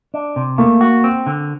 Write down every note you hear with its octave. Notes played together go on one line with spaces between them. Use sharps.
D4
C3
A3 A#3
F#4
C4
D3